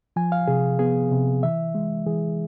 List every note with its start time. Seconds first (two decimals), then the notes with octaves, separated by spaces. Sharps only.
0.16 F3 G#5
0.32 F5
0.48 C3 G#4
0.79 B3 G#4
1.12 C3
1.43 E3 E5
1.75 G#3
2.06 E3 G#4